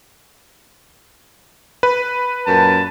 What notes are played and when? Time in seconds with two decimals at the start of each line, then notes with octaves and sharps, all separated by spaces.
1.83 B4
2.47 F#2 A#2 A5